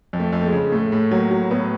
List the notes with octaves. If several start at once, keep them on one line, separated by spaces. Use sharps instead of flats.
F2
A3
F2
A3
G#3
C#3
A2 A3
A2
F#3 A#3
F#3
A2 B3